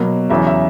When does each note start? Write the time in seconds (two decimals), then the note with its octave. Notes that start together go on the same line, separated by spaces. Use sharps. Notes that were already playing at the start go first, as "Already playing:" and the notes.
Already playing: B2 F#3 A#3
0.29 E2 C#3 F#3 E5
0.47 E5